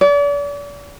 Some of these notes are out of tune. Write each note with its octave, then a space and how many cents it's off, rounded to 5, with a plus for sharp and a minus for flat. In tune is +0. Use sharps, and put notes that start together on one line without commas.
D5 -40